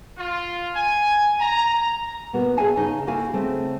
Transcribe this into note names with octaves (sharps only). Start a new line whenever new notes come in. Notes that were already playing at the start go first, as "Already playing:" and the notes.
F4
G#5
A#5
B2 A#3 B3 F#4
G#4 A4 C#5 E5 G#5 A5
C#3 D#4 C#5
A#3 E4 F#4 A4 F5 G#5
C#3 A3 C4